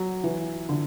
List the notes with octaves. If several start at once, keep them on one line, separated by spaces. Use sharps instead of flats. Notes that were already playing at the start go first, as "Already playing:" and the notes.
Already playing: F#3
E3
D3